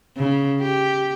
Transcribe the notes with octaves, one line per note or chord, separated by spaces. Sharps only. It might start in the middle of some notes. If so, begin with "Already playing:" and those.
C#3
G4